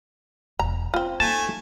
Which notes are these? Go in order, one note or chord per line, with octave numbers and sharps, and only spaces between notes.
E1 B2 A#5
C4 C#4 F4
A3 A#3 D#4 G#5 A5